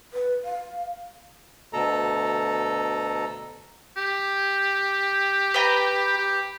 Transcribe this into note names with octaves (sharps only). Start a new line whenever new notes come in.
B4
F5
D2 B2 A4 A#5
G4
B4 G5 A#5
G4